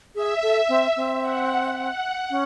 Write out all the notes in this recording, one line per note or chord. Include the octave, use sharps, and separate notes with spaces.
G#4 E5
A4
C4
C4
F#5
F#5
C#4